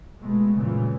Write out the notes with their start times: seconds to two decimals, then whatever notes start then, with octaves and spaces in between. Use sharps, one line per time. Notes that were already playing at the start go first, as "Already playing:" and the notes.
0.21 B2 G#3 A3 B3
0.56 F#2 A#2 C#3 E3 F3